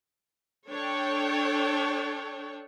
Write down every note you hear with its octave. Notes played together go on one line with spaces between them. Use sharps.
D4 A4 C#5 G5